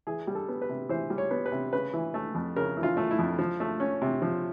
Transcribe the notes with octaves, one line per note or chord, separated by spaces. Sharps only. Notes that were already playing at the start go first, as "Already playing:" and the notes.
E3 G#4
G3
A4
B3
B4
C3
E3 C5
G3
C#5
B3
B4
C3
C#3 B4
E3
A3
F2
C#3 A#4
E3
F4
A3
E4
F2
F3
A3
C#4
C3
F3